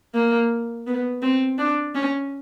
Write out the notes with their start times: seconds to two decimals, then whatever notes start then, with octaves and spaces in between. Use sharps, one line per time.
0.14 A#3
0.87 B3
1.22 C4
1.58 D4
1.95 C#4